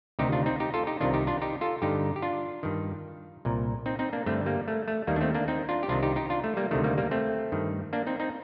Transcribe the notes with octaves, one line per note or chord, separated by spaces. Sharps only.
D2 C3 D#3 D#4 G4
D4 F4
C4 D#4
D#4 G4
F4 A4
D#4 G4
C2 C3 D#3 D4 F4
D#4 G4
D4 F4
D#4 G4
F4 A4
G2 D3 D#4 G4
G4
D4 F4
G2 D#3
C2 A#2
C4 D#4
C4 D#4
A#3 D4
G2 D3 A3 C4
G3 A#3
A3
A3
D#2 D#3 G3 A#3
D4
A3 C4
A#3 D4
C4 D#4
D4 F4
G4
C2 C3 D#3 D4 F4
D#4 G4
D#4 G4
D4 F4
A3
G3 A#3
D2 C3 D#3 A3
G3 A#3
G3 A#3
A3 C4
G2 D#3
A#3 D4
C4 D#4
C4 D#4